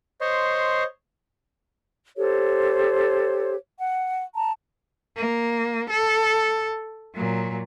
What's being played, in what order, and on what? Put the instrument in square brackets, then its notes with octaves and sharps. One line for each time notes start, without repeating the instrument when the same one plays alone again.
[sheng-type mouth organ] C5 C#5 D#5 C6
[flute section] G4 A4 C5 C#5
F#5
A5 A#5
[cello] A#3
A4
A#2 F#3